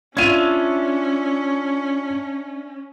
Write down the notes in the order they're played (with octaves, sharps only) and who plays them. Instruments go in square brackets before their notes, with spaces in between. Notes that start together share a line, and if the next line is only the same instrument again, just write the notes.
[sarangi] C#4 [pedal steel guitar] D4 E5 [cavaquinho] F4 C#6 [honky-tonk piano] G#6 D#7 F7